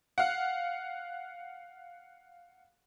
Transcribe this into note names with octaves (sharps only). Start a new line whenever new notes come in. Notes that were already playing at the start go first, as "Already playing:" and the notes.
F5 F#5